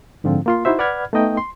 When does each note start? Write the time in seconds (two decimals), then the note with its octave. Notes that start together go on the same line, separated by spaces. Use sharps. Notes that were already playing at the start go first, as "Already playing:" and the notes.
0.24 G#2 D3 F3 C4 F4
0.46 A#3 F4 C6
0.65 D#4 E4 F#4 C5 E5
0.79 B4 D5 F#5 B5 F6 G#6
1.13 A3 B3 D#4 D#5 G5
1.37 C6